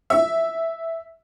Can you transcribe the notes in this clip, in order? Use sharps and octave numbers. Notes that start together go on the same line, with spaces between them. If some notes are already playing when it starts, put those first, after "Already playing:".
E5